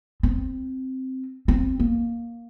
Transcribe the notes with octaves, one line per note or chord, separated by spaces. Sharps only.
C4
C4
A#3